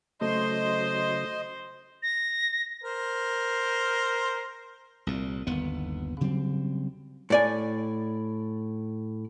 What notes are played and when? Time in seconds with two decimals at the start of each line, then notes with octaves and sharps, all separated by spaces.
0.21 C#3 F#3 A3 C5 D#5 C6
2.03 A#6
2.83 A#4 C5
5.07 C2 A#2
5.47 G1 D#2 B3
6.21 C#3 F#3 G3 C4
7.30 A2 D5 G#5